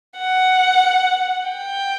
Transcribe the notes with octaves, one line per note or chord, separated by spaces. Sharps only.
F#5
G5